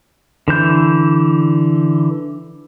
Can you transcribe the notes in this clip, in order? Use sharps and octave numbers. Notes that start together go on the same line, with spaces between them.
D3 E3 G6